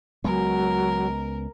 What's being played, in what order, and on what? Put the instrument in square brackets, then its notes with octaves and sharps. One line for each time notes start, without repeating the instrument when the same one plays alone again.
[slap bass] C#2 G#3 B3 [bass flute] F#3 [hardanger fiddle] A#4